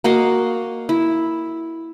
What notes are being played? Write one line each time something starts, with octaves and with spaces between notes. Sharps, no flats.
A#3 F#4 D#5 F5
E4